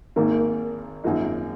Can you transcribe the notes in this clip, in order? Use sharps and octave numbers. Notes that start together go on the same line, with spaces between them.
G#1 G#2 D#3 A#3
G#1 F#2 F3 A#3 D#4